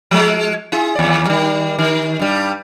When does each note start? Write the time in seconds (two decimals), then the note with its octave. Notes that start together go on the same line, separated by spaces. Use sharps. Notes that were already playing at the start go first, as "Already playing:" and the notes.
0.11 F3 G#3
0.72 E4 G#4
0.95 D#2 D5
1.26 D#3 G3
1.78 D#3
2.19 G2 G3